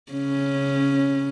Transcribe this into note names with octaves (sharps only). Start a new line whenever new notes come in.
C#3 C#4